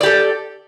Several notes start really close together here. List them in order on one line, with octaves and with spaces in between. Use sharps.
D5 G4 A4